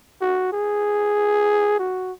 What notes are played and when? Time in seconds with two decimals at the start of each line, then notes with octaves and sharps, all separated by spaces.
0.21 F#4
0.52 G#4
1.79 F#4